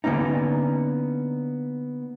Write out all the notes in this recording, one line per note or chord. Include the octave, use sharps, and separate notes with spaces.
D3 A#3 B3 C#4 D#4